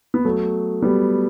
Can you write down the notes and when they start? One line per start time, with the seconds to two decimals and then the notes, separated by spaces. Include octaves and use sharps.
0.14 B3
0.25 F#3 A3
0.82 G3 B3